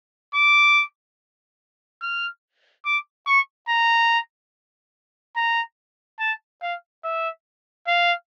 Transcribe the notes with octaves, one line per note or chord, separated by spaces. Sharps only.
D6
F6
D6
C#6
A#5
A#5
A5
F5
E5
F5